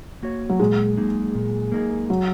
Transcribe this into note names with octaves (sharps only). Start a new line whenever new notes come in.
A#3 F#4 C#5
F#3
A#2 G#3
A#3 D#4 G#4
A#2
A#3 D#4 G#4
F#3